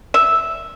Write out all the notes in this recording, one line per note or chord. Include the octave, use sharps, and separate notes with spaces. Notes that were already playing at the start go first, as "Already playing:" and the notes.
E5